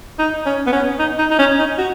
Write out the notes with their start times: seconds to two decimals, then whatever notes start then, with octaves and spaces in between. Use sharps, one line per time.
0.19 D#4
0.46 C#4
0.67 B3
0.72 C#4
0.99 D#4
1.19 D#4
1.31 D#4
1.39 C#4
1.59 D#4
1.78 F#4